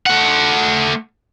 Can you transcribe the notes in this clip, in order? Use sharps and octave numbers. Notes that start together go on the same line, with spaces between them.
A3 F#5